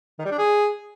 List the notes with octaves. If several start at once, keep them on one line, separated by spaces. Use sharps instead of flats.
D#3
G3
D4
G#4